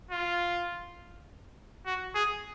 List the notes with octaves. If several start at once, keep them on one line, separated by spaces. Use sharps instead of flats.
F4
F#4
G#4